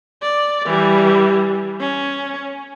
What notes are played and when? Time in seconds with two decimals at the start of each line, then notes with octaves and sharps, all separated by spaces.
0.22 D5
0.66 E3 G3
1.80 C#4